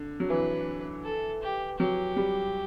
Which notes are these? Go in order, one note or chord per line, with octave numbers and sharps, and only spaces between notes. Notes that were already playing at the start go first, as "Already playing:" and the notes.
Already playing: D3
F#3
E3 B4
A4
G4
F#3 G4
G3